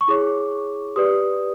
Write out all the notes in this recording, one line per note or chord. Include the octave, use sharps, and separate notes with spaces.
C#6
E4 G#4 C#5 D6
G4 B4 D5 D#6